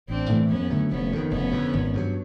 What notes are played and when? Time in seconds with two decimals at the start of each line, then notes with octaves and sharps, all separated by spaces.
0.08 A1 C4 D4
0.30 A2 E3 A3
0.49 F2 B3 C#4
0.70 D3 F#3 A3
0.91 F1 B3 C#4
1.12 F2 C3 D#3
1.31 F1 B3 C#4
1.51 F2 D3
1.73 G#1
1.93 G2 D#3 F#3